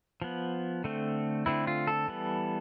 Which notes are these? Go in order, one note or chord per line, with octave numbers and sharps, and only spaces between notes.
F3 B3
D3 A3 C4
D3 A3 C4 E4
F4
A4
E3 G3 B3